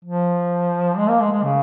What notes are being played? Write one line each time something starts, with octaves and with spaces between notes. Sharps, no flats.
F3
G#3
A#3
G#3
G#3
C#3